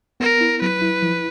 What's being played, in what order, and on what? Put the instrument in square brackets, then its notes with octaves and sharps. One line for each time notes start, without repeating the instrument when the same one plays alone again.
[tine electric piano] B3 [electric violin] A#4
[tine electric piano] E4
[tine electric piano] F#3 [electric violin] B4
[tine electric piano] E4
F3